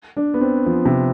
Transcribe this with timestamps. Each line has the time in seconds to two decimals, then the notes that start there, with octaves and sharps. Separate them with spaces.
0.17 D4
0.34 B3
0.41 C4
0.66 F3
0.85 C3